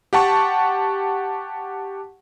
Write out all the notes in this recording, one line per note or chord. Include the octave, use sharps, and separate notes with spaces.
G4 F#5 A5 C#6